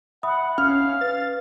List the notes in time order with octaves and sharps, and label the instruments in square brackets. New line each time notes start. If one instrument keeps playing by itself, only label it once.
[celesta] E5 B5 D#6 [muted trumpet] F#5
[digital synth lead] C#4 [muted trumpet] F5 [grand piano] F6
[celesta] B4 [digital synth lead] A6